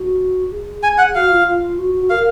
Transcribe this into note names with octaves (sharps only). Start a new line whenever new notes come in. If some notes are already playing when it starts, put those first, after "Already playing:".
Already playing: F#4
G#4
G#5
F#5
F#4 F5
F4
F4
F#4
F#4
A#4 F5